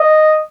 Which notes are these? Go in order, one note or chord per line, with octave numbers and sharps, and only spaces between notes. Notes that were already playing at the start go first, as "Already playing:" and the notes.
Already playing: D#5